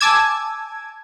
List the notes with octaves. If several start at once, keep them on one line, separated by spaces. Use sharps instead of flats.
G#5 A5 D6 E6 G#6